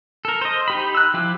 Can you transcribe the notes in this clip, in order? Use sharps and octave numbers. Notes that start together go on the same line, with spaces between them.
A4 A#4
C5 D#5
D#4 G4 B5
E6 F#6
F3 E4 G4